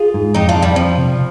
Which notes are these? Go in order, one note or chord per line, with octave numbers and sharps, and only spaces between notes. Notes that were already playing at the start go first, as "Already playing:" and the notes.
Already playing: F4 G#4
G#2
F2 D#4 G4
D4 F4
F2
G3
F3 C4
C3